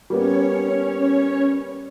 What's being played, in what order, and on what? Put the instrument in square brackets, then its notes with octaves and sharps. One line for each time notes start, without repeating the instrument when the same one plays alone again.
[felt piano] G3 A#3 B3 [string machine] C#4 C#5